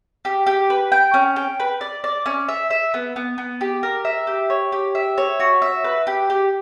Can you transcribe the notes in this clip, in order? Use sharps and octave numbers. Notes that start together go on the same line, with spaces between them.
G4
G4
B4
G5
C#4
G5
B4
D5
D5
C#4
E5
E5
B3
B3
B3
G4
A#4
E5
G4
C#5
G4
E5
C#5
F#4
E5
B4
G4
G4